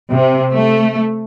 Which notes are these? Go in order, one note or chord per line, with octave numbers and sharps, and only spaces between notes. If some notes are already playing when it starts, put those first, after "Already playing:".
C3
A3